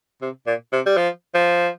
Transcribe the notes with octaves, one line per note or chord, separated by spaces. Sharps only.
C3
A#2
C3
G3
F3
F3